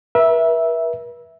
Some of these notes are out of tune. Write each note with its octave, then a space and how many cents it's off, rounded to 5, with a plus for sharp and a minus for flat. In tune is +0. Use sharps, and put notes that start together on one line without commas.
B4 -45 E5 -5